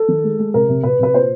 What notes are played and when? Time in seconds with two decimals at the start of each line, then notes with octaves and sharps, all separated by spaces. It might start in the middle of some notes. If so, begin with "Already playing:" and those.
Already playing: A4
0.08 D#3
0.24 G#3
0.39 G#3
0.54 C3 A#4
0.69 C3
0.83 C3 B4
0.99 C3 B4
1.14 A#2 C5